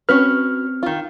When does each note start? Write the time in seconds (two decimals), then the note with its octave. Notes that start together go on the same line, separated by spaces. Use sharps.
0.09 C4 C#4 F#4 B4 F6
0.83 D#3 F4